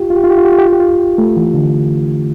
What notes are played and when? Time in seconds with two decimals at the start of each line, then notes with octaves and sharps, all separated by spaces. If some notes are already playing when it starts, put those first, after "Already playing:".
Already playing: F4 G4
0.10 F4
0.16 G4
0.24 F4
0.30 G4
0.38 F4
0.45 G4
0.52 F4
0.59 G4
0.66 F4
0.73 G4
0.80 F4
1.18 A3
1.37 E3
1.54 D3